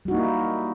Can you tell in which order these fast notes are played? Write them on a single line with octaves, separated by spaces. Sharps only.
G3 F#4 D#4 A#3 E4